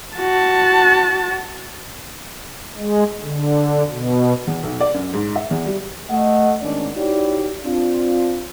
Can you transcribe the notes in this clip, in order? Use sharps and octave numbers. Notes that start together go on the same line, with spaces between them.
F#4 A5
G#3
D3
B2
E2
B1
D5
F#2
G#2
E5
E2
G3
A3 D#5 F#5
G#1 D#3 C#4 D4 D5
D#4 E4 F#4 G4 C#5 D5
C4 D4 F4